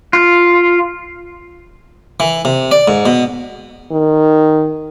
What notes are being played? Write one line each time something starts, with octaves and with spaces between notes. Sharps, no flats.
F4
E3
C3
D5
G#2
B2
D#3